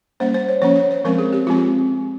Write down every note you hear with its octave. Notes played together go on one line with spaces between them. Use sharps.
G3 A#3 C#4 C5
C5
C#5
F3 A#3 C#4 C#5
C#5
C5
F3 G#3 C4 A#4
G#4
G4
F3 G#3 C4 F4